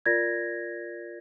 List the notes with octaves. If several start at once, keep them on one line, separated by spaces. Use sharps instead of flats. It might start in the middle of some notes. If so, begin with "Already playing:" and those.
F4 A#4 D5 G#6 A#6